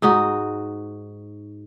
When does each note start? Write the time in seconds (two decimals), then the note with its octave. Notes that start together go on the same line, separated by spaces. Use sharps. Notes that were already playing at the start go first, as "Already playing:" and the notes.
0.02 G#2 D#4 F#4